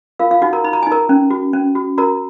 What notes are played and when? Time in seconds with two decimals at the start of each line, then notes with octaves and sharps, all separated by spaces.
0.19 F4 A#4 F5
0.31 F4 F5
0.42 D#4 F#4 F#5
0.53 A#4 A#5
0.64 D#4 B5
0.73 A#5
0.83 D#4 G#5
0.92 A#4 A#5
1.09 C#4
1.30 F#4
1.53 C#4
1.75 F#4
1.98 F#4 A#4 A#5